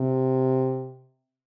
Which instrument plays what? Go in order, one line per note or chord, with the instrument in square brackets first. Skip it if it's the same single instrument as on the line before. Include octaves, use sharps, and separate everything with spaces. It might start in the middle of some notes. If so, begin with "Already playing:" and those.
Already playing: [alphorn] C3